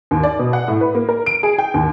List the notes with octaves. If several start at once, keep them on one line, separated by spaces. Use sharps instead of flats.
D#2
D5
B2
F#5
A2
B4
A#3
A#4
D7
G#4
G5
D#2